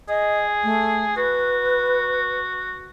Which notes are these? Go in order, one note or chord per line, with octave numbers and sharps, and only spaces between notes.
G#4 D#5
A3
F#4 B4